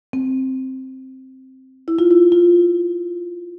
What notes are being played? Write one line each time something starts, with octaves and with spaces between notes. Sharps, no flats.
C4
E4
F4
E4
F4